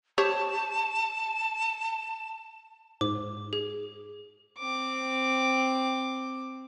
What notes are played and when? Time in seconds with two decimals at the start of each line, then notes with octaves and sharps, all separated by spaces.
0.18 G4 C5 C#5 A5
3.01 G#2 D6
3.53 G#4
4.58 C4 D6